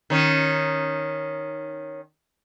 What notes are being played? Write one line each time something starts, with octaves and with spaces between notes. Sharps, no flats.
D#3 C#4